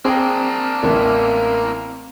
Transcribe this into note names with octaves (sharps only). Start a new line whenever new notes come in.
A#3 C4 D4 G#4 G5 A#5
A1 E3 B3 E4 A#4